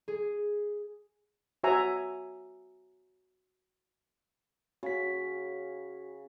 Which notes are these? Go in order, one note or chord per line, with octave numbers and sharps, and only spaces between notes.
G#4
F#4 C#5 E5 G#5 A#5
C#3 F#4 B6